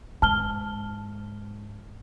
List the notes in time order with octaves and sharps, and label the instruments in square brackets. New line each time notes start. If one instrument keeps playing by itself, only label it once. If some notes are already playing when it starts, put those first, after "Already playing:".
[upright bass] G#2 [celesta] A5 F6 G7